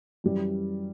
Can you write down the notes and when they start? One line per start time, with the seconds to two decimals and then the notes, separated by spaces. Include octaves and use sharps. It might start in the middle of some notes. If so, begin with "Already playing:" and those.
0.24 F#2 E3 G3